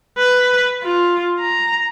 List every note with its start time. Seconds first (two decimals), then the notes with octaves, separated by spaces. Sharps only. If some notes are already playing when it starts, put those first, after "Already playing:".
0.18 B4
0.83 F4
1.39 A#5